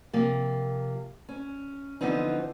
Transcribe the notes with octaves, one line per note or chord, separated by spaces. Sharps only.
C3 F3 A#3
C#4
D3 E3 F3 B3 C4 D#4